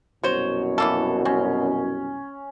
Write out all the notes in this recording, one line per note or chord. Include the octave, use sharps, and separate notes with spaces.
C2 F#2 B2 F#4 C5 C#5
E3 A#3 A4
C4 C#4